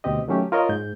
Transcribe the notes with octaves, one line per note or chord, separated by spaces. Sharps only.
D2 B2 C4 G4 D#5
D#3 F#3 A3 C#4 G4
F4 A#4 C#5 D#5
G#2 G6